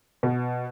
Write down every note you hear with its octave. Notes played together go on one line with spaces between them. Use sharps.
B2